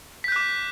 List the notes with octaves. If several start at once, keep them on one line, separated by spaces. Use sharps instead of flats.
D6 F#6 G6 B6